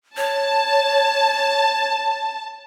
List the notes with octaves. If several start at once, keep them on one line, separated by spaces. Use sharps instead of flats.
C#5 A5